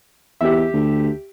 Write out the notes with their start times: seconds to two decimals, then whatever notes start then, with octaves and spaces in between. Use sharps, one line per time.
0.41 E2 G4 E5
0.74 D2